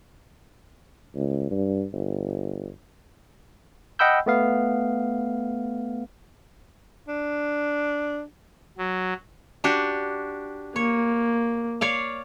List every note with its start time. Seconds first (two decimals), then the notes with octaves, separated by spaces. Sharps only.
1.15 C#2
1.51 G2
1.93 G1
3.99 D#5 F#5 G5 B5 E6 G6
4.26 A3 B3 F5
7.08 D4
8.78 F#3
9.64 D4 F#4 G4
10.76 A#3 C#5
11.81 C#5 D5 F5